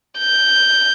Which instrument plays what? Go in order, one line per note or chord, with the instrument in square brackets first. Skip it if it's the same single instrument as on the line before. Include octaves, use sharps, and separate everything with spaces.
[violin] G6